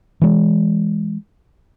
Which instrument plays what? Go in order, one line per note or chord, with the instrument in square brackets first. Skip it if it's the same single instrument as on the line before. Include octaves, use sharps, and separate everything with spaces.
[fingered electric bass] E3 G#3